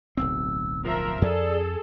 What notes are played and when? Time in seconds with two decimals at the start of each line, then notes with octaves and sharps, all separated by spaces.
0.17 D1 B1 C4 E6
0.84 F3 A#4 E5
1.22 F2 G#4 A4 D5